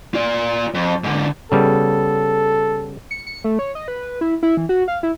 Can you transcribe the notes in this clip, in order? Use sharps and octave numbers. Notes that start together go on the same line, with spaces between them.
F4 D5
F2
G#2 D3
C#3 G3 B3 A4
C#7
C#7
A3
C#5
D#5
B4
E4
E4
E3
F#4
F5
E4